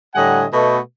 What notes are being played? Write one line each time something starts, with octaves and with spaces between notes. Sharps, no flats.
A2 D3 G3 D#5 F#5 G#5
B2 A3